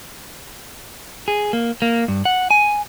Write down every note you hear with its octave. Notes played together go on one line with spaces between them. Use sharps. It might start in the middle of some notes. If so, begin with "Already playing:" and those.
G#4
A#3
A#3
G2
F#5
G#5